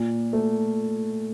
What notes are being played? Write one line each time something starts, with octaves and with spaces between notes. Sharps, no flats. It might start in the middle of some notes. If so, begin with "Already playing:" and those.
Already playing: A#2
A3